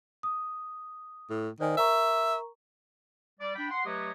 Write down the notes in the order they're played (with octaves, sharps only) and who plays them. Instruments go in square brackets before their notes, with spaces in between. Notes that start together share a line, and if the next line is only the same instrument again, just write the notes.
[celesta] D#6
[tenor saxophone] A2
[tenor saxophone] D#3 [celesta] C5 D5 G#5
[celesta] A#4 A#5 C#6 [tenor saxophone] E5
[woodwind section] G3 D5
D4 G5 B5
F#5 C6
F#3 A3 G4 B4 C#5 D#5